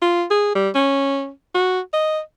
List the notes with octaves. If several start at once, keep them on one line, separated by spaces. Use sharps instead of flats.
F4
G#4
G3
C#4
F#4
D#5